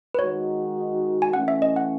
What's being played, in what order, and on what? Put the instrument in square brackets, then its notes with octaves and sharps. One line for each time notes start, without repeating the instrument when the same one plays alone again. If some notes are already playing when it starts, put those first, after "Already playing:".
[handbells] B4
[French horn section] D#3 G#3 D#4 F#4 [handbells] C#5
[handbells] G#5
[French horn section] E3 A3 C#4 [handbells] F#5
[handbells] E5
D#5
F#5